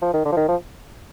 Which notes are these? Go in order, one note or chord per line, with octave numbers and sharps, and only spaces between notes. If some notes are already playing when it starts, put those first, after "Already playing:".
F3
D#3
D3
F3
D#3
F3